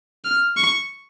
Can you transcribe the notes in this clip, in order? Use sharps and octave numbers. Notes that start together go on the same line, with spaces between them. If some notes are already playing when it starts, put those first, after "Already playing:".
F6
C#6